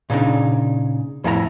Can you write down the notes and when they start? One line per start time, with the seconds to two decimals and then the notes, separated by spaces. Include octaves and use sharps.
0.10 A#2 C#3 D4 D#4
1.24 F2 A2 E4 A4 A#5